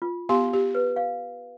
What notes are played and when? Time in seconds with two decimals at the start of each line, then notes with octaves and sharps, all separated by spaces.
0.02 F4
0.29 B3 G4 F5 C6
0.54 G4
0.75 B4
0.96 F5